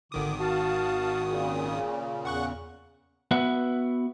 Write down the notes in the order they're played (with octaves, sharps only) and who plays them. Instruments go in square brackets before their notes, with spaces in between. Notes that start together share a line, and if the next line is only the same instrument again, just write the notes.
[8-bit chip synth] G#1 D#3 D#6 [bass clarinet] D3 [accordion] D6
[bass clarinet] F#4 [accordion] F5 A5
[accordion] A#2 C#3
[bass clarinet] E2 [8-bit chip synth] F#5 C#6 F#6
[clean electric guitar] B3 F#4 B4 E5 F#5